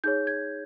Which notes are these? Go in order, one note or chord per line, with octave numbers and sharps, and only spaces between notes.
D#4 G#4 C#5 G6
G#6